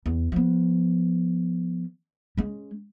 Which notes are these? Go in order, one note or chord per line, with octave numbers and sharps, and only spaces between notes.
E2
F3 B3
G#3 C#4